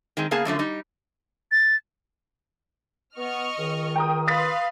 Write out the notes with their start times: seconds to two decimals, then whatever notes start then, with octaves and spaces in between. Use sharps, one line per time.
0.17 D#3 G#3 C4
0.31 C#3 A#3 B3 G#4 F5 A5
0.45 F#2 D3 F3 A3
0.59 G3 D#4
1.51 A6
3.17 B3 D#5 C#6 F6
3.58 C#2 D#3
3.95 G5 A#5 D#6
4.27 B4 F5 C6 D#6 A6 B6